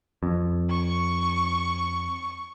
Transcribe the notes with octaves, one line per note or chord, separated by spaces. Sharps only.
F2
C#6